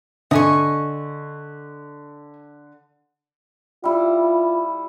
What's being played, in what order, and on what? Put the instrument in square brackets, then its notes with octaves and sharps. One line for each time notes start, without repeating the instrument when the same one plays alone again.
[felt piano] D3 [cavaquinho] D#5 G#5 C#6
[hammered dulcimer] G3 E4 [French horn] F4